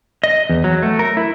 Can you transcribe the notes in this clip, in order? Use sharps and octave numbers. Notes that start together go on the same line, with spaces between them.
D#5
E2
F#3
A3
A#4
E4